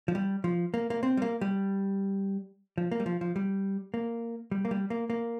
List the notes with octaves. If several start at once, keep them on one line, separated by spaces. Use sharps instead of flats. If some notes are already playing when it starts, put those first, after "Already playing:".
F3
G3
F3
A#3
A#3
C4
G3
A#3
G3
F3
A#3
G3
F3
F3
G3
A#3
G3
A#3
G3
A#3
A#3